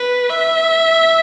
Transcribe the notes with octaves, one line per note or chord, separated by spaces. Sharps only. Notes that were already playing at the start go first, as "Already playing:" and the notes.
Already playing: B4
E5